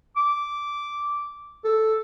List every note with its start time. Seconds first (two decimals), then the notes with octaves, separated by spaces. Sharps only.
0.16 D6
1.64 A4